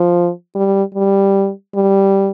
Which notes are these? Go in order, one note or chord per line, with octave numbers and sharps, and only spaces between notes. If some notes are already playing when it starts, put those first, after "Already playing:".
Already playing: F3
G3
G3
G3